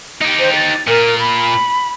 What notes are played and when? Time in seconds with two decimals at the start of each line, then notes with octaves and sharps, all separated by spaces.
0.21 D#4 G4
0.39 C5
0.55 A6
0.87 A#2 A#4
1.20 B5